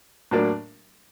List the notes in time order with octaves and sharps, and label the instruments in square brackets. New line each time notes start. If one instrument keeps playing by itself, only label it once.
[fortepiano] A2 F#3 A#3 D4